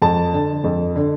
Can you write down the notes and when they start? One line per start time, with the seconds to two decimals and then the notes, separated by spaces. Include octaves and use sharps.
0.02 F2 A5
0.33 D3
0.64 F2
0.96 D3